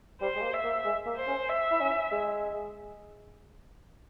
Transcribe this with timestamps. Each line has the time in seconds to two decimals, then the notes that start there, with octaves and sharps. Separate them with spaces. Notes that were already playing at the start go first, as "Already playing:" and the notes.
0.21 G3 C5
0.36 G#3
0.42 A#3
0.54 E5
0.64 A#3
0.85 G#3
1.06 A#3
1.16 C5
1.28 C#4
1.49 E5
1.71 E4
1.81 C#4
2.12 G#3